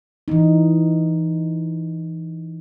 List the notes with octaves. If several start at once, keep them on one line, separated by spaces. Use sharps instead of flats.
E3 D#4